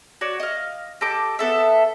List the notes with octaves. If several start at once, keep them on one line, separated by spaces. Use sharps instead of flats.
F#4 C#5 D5
D#5 F5
G4 A4 D#5 D6
B3 A4 E5